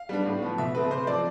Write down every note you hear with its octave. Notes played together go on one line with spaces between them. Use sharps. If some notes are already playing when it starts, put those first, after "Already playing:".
Already playing: F5
G3 B3 D4
A2
F3 B3
B2 E5
A3 C4 B4
C3 C5
F3 C4 D5